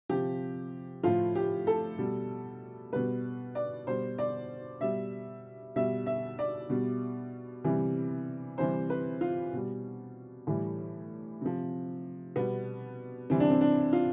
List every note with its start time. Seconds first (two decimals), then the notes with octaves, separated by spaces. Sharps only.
0.09 C3 F3 G4
1.03 A2 F3 F4
1.35 G4
1.67 A4
1.98 B2 G3
2.93 B2 G3 B4
3.55 D5
3.87 B2 G3 C5
4.18 D5
4.81 B2 G3 E5
5.76 B2 G3 E5
6.06 E5
6.39 D5
6.69 B2 G3
7.64 C3 E3 G3
8.58 C3 E3 G3 C5
8.90 B4
9.21 F4
9.53 B2 G3
10.47 A2 E3 G3
11.41 C3 F3
12.36 B2 G3 B3
13.30 C3 E3 G3 C4
13.40 D4
13.50 C4
13.61 D4
13.93 F4